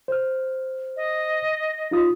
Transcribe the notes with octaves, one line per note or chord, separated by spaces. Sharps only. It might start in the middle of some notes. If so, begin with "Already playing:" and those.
C5 F6
D#5
D#4 F4 D#6